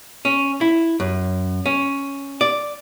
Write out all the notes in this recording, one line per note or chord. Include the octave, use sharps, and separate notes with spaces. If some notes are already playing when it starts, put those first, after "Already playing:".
C#4
E4
F#2
C#4
D5